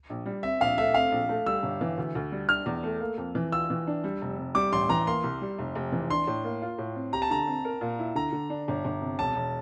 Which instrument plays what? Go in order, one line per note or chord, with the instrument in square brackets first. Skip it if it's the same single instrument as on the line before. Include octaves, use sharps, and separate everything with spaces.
[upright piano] A#1
G3
[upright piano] C4 [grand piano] E5
[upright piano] A#1 [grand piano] F5
[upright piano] A3 [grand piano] E5
[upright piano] C4 [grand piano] F5
[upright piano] A#1
A3
[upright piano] G3 [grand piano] E6
[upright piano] G1
E3
D2
D2
G3
[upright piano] D4 [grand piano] F6
[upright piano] E2
A3
A#3
F2
E3
[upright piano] F4 [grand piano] E6
[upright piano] E3
D4
G3
F1
C3
[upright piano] G3 [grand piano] D6
[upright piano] A1 [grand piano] C6
[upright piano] E3 [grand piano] A#5
[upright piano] A#3 [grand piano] C6
[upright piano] C2
G3
F1
F1
E3
[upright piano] D4 [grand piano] C6
[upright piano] A2
A#3
F4
A2
C4
[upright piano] G4 [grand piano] A#5
[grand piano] A5
[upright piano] D3 [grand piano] A#5
[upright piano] C4
A#4
A#2
E4
[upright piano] D3 [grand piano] A#5
[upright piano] D3
D4
G1
G1
C3
[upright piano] E1 [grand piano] A5
[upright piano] E1